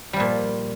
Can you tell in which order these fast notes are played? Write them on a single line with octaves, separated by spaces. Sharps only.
G3 F3 A#2